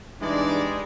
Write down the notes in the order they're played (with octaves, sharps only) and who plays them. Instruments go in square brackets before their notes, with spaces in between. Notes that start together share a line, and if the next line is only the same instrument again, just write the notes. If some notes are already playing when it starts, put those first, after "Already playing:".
[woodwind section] E2 E3 D4 [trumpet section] G3 G#3 [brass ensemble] D#4 D5